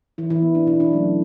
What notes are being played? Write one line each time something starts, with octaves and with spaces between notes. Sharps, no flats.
E3 E4
E3 E4
B3
D4
B2 E4
D4
F#3 A3 C#4